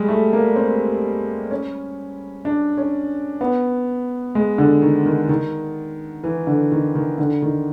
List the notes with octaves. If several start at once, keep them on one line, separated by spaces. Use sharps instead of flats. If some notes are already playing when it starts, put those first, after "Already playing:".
Already playing: G3 G#3
A3
A#3
C4
C#4
D4
C#4
B3
G#3
D3
D#3
D#3
D#3
E3
D3
D#3
D#3
D3
D#3